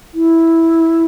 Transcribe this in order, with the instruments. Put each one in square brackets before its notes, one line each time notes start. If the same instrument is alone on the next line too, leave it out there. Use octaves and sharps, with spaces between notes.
[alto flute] E4